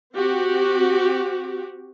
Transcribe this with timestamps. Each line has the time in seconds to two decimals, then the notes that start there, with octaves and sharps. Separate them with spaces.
0.13 C4 F#4 G4